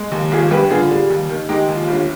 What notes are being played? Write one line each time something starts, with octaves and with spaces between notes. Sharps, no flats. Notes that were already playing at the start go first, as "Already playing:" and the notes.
Already playing: G#3
D#2
G#1 F4 G#4
G2 G4 B4
D3 F4 G#4
G3
D#2
D#3
G#3 D#4 G4
D#2
F4
G1 F4